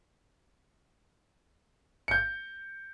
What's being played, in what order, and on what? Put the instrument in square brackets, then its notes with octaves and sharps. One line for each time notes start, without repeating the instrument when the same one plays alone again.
[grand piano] G6 C#7